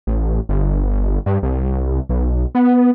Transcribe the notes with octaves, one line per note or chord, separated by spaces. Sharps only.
A1
G1
G2
C2
B1
B3